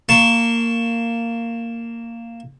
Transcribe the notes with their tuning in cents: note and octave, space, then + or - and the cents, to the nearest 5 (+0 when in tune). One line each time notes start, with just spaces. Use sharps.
A#3 -15 A5 +0 C#6 +0